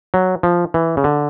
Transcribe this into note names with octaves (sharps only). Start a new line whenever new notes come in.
F#3
F3
E3
C#3
D3